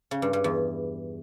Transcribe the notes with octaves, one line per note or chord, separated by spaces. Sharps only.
C#3
G2
G2
E2